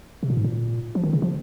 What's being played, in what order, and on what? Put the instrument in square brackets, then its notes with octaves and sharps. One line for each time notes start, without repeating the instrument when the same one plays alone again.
[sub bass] C3
A#2
G#2
A#2
F3
D#3
C#3
F3